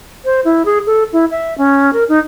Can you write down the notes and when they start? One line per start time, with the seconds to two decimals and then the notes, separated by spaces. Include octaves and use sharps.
0.25 C5
0.45 E4
0.65 G#4
0.87 A4
1.13 E4
1.31 E5
1.58 C#4
1.93 A#4
2.09 D#4